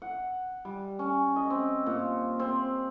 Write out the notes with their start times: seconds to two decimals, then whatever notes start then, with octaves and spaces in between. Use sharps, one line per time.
0.02 F#5
0.65 G3
0.99 C#4
1.36 D#5
1.50 C4
1.86 A#2
2.40 C4